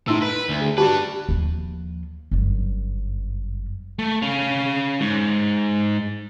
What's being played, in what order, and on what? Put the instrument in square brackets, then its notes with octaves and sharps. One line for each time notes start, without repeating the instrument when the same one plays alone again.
[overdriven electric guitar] A2 [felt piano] D#4 C6 E6
[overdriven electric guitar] B4 [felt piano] B6
[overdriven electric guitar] D2
[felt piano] G#4
[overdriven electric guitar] D4 B4 [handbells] F#4 G4 [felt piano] A5
[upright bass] D#2 F3
G1 F#2
[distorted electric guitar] A3
C#4 F5
G#2